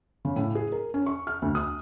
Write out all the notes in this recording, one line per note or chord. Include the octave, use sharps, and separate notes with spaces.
C#3
A2
G#4
A#4
C#4
C#6
F6
D2
D#6